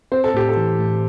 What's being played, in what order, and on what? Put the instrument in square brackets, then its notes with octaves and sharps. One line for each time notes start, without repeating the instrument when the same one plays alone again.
[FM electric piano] C4 [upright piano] C5
[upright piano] A4
[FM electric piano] A2 [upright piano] G4
[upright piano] A4
[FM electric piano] E3
A2